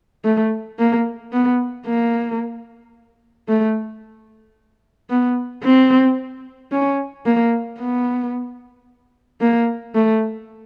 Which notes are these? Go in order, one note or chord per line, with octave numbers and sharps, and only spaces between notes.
A3
A#3
B3
A#3
A3
B3
C4
C#4
A#3
B3
A#3
A3